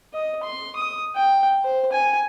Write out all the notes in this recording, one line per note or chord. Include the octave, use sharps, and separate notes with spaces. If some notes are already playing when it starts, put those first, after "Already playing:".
D#5
C6
D#6
G5
C5
G#5